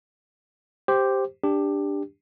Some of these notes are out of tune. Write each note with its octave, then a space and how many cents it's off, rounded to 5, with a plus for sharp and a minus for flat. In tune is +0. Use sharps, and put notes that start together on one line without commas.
G4 +0 C5 +0
D4 +0 G4 +15